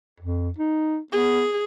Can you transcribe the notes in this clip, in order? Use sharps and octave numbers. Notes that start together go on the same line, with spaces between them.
F2
D#4
B3 G#4